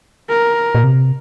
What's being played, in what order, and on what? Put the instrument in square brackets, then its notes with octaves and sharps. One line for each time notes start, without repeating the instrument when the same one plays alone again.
[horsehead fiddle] A#4
[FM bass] A#2
C3